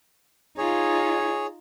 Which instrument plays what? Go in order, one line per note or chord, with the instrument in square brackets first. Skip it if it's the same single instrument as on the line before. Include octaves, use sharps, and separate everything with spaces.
[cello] D#4 F4 [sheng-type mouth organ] G#4 C#5